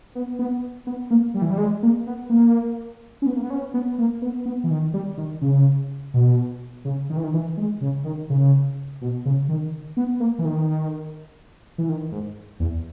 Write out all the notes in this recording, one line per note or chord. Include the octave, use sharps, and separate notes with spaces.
B3
B3
B3
A#3
G3
E3
G3
G#3
A#3
B3
A#3
C#4
B3
A#3
B3
C#4
B3
A#3
B3
B3
E3
D#3
G3
D#3
C#3
B2
C#3
D#3
E3
D#3
E3
G#3
C#3
D#3
C#3
B2
C#3
D#3
B3
A#3
E3
D#3
E3
D#3
G#2
E2